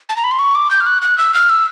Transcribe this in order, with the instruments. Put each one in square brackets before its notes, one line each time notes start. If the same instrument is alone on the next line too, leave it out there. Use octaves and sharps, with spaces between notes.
[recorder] A5
A#5
B5
C6
C#6
D6
G6
F6
F#6
F#6
E6
F6
E6